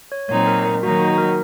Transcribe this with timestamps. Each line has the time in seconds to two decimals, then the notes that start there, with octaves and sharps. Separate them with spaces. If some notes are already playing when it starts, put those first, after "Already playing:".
0.12 C#5
0.29 A#2 F#3 C4 D#4 C#5
0.47 A#4
0.65 A#4
0.83 D#3 F#3 A#3 D#4 F#4
1.01 F#4
1.18 A#4